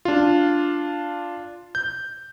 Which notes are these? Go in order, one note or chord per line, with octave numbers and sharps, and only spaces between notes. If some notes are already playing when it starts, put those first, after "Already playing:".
D4 F4
G6